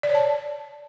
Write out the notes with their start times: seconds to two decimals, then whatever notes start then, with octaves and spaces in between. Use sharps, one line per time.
0.03 D5
0.09 C#5
0.15 A5